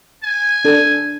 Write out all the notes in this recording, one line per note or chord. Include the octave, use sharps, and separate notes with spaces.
G#5
D4 A4